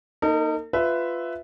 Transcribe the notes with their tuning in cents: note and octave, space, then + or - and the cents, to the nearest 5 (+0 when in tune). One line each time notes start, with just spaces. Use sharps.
A#3 +10 D#4 +0 A#4 -45
F4 +0 B4 +15 E5 +0